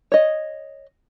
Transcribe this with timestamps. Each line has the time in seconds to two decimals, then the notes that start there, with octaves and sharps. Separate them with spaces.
0.12 C#5 D#5